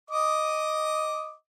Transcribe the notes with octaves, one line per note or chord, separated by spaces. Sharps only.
D#5 D6 D#6